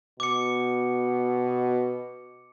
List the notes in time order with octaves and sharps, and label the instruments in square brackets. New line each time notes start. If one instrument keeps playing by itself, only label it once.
[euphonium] B2 [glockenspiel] D6 C#7